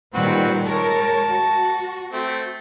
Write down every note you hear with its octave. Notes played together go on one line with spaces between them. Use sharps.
A#2 D#3 G3 C4 F#4 B4
G#3 A#4 C#5 A5
F#4
A3 C4